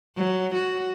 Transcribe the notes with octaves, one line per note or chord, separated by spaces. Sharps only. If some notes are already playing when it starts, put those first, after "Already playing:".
F#3
F#4